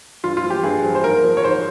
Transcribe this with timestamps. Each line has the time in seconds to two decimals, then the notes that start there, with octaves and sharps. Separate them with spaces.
0.24 G2 F4
0.37 F4
0.44 F3
0.50 G4
0.63 G2 G#4
0.84 F3
0.95 C5
1.04 G#2 A#4
1.24 F3
1.37 C#5
1.44 G#2 C5